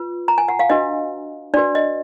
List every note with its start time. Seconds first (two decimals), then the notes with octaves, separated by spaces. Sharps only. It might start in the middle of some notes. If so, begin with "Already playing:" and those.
Already playing: F4 B4
0.28 A#5
0.38 G#5
0.48 F#5
0.59 F5
0.70 D4 F#4 B4 D#5
1.54 D4 F#4 B4 D5
1.75 D#5